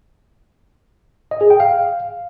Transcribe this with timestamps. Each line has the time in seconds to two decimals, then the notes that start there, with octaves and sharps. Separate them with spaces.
1.31 D#5
1.41 G#4
1.50 G5
1.60 F5